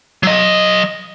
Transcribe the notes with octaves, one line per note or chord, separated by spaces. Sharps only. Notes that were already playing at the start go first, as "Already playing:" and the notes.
F#3 D#5